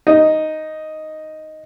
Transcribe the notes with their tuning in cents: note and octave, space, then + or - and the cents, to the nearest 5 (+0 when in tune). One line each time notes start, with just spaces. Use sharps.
D#4 +0